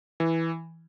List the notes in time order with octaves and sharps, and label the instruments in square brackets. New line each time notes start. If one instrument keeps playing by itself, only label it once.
[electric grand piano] E3